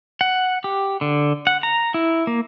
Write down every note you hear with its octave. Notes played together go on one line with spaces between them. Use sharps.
F#5
G4
D3
F#5
A#5
E4
A#3